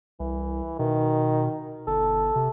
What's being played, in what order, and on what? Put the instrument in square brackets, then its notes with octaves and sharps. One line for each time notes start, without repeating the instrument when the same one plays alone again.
[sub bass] C2 [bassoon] E3
[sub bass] B2 [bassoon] D#3
[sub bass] G1 [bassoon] A4
[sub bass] C3